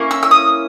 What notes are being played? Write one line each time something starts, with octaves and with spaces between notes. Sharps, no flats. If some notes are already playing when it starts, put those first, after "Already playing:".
Already playing: A#3 C#4 E4
E6
E6
D#6